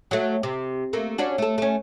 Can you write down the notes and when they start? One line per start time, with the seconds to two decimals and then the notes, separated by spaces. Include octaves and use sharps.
0.11 F#3 A3
0.43 C3
0.93 A3 A#3
1.18 C#4 D4 F#4
1.38 A3 A4
1.58 A3 C#4